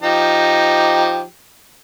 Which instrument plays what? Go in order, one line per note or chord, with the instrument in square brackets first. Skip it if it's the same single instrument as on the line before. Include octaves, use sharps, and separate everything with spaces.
[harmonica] F3 D#4 G4